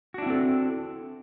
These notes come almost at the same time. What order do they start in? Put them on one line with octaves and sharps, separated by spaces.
F#4 D4 E4 C4 A4